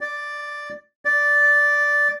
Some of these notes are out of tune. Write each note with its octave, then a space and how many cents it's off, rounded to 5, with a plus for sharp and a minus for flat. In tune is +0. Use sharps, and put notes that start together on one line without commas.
D5 +0
D5 -5